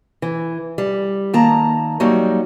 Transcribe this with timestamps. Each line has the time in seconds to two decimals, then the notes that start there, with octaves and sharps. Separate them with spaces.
0.22 E3
0.78 G3
1.34 D#3 A#3 A5 A#5
2.00 F#3 G3 A#3 D#4 F#4